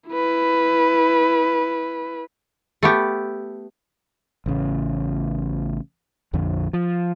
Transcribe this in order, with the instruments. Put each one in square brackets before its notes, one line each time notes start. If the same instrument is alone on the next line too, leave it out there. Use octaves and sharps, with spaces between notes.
[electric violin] E4 B4
[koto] A3 B3 G4
[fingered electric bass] A1 C#3
A#1 F2 D3
F3